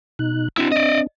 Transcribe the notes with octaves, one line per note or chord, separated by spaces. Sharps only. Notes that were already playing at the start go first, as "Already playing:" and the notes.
B2 D#4 F#6
C4 D4 E4 F#4
D5 D#5